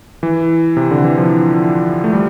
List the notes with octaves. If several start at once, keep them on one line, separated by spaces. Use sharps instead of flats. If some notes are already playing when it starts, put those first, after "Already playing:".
E3
C3
D3
E3
F3
A3
G3